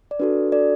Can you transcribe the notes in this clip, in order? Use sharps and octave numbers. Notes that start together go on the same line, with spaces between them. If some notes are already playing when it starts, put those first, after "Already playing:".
D5
D4 F#4 A4 B4
A4 D5